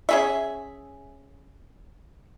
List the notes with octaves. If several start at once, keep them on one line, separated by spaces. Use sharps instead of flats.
C#4 G#4 E5